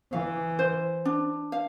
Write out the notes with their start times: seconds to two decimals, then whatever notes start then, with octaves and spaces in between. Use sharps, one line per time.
0.12 E3 F5
0.59 C5
1.05 D4
1.52 F5